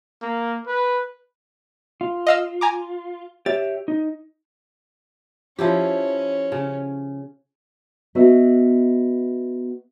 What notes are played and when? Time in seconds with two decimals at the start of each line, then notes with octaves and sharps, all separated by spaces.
0.22 A#3
0.67 B4
2.01 F4
2.27 D#5 F5 E6
2.61 G#5 A#5 D6
3.46 G4 C#5 E5 A6
3.88 D#4
5.59 F3 C#4 E4 G4
6.52 C#3
8.15 B3 F#4 D#5 E5